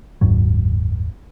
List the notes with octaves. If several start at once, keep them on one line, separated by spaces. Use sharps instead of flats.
F#1 D#2 G#2 F#3